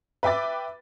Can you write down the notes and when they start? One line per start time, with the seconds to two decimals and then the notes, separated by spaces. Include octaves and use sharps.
0.23 B4 E5 G5 D6 A6